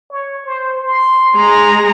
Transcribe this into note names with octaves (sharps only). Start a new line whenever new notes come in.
C#5
C5
C6
G#3 A#5